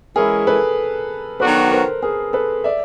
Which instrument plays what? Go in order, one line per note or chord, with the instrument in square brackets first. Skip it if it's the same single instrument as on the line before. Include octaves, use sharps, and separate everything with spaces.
[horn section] E3 G#3 C#4 E4 [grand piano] G#4 A#4
[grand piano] A4 B4
[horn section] D#3 F#3 B3 D4 F#4 [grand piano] A4 B4
[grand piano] A#4 C5
G#4 A#4
A4 B4
D5 E5